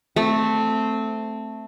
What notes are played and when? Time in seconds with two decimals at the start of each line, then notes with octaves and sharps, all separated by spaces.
0.16 A3 C4